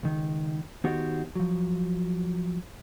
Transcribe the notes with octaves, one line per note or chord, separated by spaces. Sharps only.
C#2 D#3
D#3 B3 D#4 F#4 G4 C5
F3 F#3